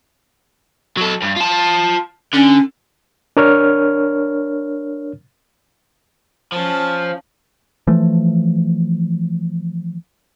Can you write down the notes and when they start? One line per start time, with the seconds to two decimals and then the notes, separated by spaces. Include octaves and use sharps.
0.97 F#3 A4
1.22 G2
1.36 F4 A5
2.34 D3 C#4
3.37 D4 A#4 C#5 F6
6.52 F3 C#4 A5
7.87 E3 F3 A3